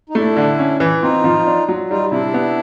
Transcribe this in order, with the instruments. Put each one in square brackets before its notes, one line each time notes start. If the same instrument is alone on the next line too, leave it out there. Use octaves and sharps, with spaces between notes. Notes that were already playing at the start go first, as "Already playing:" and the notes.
[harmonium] D#4
[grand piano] A3 [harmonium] D4 E4
[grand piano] D3
C#4
E3
[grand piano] C4 [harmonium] D#4 F4
[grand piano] F3
D4
F#3
[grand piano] G3 [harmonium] D#4 F4
[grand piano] C3 [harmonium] D4 E4
[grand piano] B3